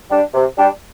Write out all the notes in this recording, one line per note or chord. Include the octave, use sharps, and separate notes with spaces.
G3 D4 G4
C3
G3 D4 G4